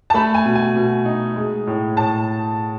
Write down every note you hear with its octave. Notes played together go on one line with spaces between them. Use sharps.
A5
A3 B5
G#5
B2
G#5
B2
D#4
G#3
A2
A2 A5